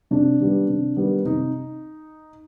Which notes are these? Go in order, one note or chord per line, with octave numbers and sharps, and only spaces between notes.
C3 D4
D#3 G3 B3
C3
D#3 G3 B3
C3 D#4